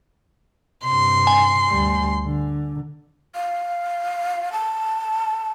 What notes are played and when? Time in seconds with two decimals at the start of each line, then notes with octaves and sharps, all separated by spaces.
0.84 G2 C3 C6
1.27 G#5
1.67 D2 G3
2.25 D3
3.35 F5
4.53 A5